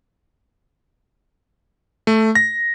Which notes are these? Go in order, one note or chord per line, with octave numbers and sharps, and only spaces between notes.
A3
A#6